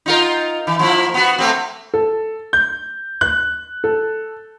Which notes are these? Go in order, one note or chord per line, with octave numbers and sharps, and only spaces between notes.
D#4 F4 A#4
E3
F3 A#3 E4
B3 F#4
A3 A#3 C4
A4
G6
F#6
A4